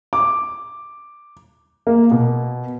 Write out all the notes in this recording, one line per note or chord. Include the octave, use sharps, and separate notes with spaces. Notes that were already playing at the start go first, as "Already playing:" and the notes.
D6
A#3
B2